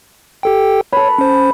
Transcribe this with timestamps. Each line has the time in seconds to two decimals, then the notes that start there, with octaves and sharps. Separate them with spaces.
0.43 G4 A4 G5
0.93 A4 B4 C#5
1.18 C#4 C5